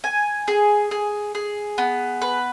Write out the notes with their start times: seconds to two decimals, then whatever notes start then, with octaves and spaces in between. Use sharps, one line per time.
0.04 G#5
0.48 G#4
0.91 G#4
1.35 G#4
1.78 B3
2.22 B4